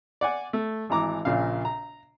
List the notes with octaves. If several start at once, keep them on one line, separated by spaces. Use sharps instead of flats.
D5 F#5 G#5 D6
A3
G#1 E3 A#5 D6
A#1 A#2 C#3 F5
A#5